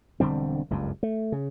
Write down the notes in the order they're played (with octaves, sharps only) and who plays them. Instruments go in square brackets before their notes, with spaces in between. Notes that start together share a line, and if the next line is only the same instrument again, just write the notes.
[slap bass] E1 D3 G3 C4
F#1 C#2 G2
A3
C#3